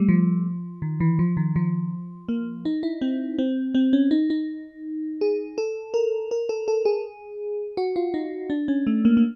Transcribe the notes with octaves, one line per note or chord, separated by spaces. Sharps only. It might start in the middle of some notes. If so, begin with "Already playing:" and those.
Already playing: G3 A3
F3
D#3
E3
F3
D#3
F3
A#3
D#4
E4
C4
C4
C4
C#4
D#4
D#4
G#4
A4
A#4
A#4
A4
A4
G#4
F#4
F4
D#4
D4
C#4
A3
A#3
A#3